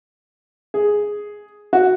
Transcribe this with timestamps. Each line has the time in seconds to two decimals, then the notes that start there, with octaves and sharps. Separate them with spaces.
0.74 G#4
1.73 F#4